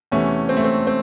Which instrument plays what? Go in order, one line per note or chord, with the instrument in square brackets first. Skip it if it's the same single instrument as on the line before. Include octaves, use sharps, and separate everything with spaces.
[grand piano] E2 C3 E3 A3 C#4
C4
A3
C4
C4